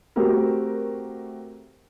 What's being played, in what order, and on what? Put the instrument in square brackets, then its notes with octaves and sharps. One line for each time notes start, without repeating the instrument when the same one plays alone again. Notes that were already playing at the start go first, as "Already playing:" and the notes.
[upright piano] A3 C4 F#4 G4 A#4